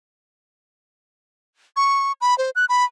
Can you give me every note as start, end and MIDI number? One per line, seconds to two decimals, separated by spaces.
1.76 2.12 85
2.21 2.37 83
2.38 2.50 72
2.55 2.65 90
2.69 2.85 83